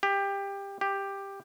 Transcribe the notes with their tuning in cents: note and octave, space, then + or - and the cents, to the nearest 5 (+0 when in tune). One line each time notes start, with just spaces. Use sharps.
G4 +20
G4 +10